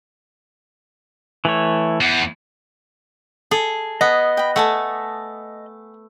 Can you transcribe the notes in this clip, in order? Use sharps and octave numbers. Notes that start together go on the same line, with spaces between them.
E3 A3 C#5
E2
G#4 A4
B3 D#5
G5 B5
A3 F#5 G#5 A5